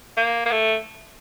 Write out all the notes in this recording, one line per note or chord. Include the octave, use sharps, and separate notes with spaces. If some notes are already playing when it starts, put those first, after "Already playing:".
A#3
A#3
A3